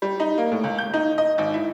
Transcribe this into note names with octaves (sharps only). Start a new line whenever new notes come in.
G3
D#4
A#3
A2
C#2
G6
D#4
D#5
G#1
E4